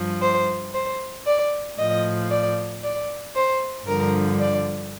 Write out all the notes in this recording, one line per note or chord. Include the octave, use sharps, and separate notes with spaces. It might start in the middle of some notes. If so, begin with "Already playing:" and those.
Already playing: G2 F3
C5
C5
D5
A2 F3 D#5
D5
D5
C5
G2 D3 F3 A#4
D5